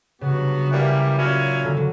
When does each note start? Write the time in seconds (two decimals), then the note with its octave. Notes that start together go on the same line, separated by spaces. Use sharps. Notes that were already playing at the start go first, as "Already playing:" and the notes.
0.21 G2 C#3 F#3 B3 F#4
0.69 F#2 E3 G3 A#3
1.17 A#2 F#3 C#4 E4
1.64 D3
1.77 F#3